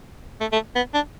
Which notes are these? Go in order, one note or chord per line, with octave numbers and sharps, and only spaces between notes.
A3
A3
B3
D4